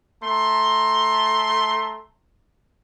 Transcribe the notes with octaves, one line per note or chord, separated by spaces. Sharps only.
A3 A#5 C6